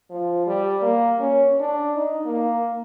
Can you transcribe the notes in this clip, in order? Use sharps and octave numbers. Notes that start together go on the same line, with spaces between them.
F3
G3
A#3
C#4
D4
D#4
A#3